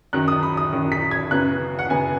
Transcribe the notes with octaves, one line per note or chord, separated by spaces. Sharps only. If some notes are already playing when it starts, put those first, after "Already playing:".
F#2 D#3 F#3 F#6
D#6
B5
D#6
F#2 D#3 F#3
B6
G#6
F#2 C#3 F#3 B3 F#6
F#5
F#2 C#3 F#3 B3 G#5